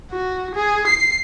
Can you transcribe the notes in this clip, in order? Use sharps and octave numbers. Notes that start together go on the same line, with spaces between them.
F#4
G#4
C7